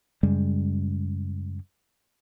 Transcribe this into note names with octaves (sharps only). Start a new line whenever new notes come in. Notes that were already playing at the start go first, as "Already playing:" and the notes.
F#2 C#3 G3 G#3